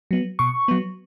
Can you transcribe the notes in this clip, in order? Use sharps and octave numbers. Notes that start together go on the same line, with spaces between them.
F#3 B3
B2 C#6
F#3 B3